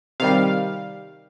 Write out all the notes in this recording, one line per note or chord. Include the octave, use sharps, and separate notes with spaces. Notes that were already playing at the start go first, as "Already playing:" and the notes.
C3 D#3 G3 F5